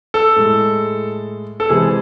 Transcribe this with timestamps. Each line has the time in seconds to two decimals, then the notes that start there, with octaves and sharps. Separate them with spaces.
0.14 A4
0.36 A2 G#3
1.60 A4
1.69 C3 E3 G#3 G#4